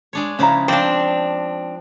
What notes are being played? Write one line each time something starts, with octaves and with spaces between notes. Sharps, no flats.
G#3 D4 C#5
C#3 F3 C#4 E4 A#5
F3 C4 D4 D5